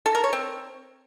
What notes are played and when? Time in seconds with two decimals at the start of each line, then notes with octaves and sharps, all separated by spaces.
0.06 A4
0.15 A#4
0.24 C#5
0.33 C4